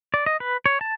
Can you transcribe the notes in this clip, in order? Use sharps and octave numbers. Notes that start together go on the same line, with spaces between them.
D5
D#5
B4
C#5
A5